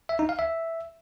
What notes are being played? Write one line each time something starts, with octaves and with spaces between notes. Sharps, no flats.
E5
D#4
F5
E5